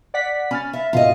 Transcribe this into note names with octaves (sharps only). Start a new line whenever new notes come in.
D5 F#5 B6
C#4 B5 F6 A6
E5
G#2 B2 D#3 F4 D#5